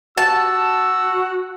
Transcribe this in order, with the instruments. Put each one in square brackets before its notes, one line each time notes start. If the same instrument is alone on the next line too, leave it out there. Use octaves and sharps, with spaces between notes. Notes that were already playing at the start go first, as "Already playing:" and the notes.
[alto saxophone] F#4 [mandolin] A5 [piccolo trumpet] E6